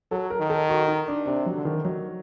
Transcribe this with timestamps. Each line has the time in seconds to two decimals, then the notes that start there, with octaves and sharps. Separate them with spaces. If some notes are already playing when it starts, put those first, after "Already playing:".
0.11 F#3 A4
0.30 A#4
0.40 D#3
0.50 A4
0.70 F#4
0.88 D#4
1.08 D4
1.26 C3 D4
1.46 F#3
1.55 D3
1.65 D#3
1.83 D#3 F#3